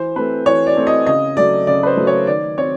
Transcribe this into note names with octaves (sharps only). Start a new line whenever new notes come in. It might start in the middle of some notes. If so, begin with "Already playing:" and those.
Already playing: E3 C5
A3 C4 B4
E3 C#5
D5
A3 C4
D#5
C#3 D#5
F#3 A3 D5
C#3 D5
B4
C5
F#3 A3
C#5
D#3 D5
C4 C#5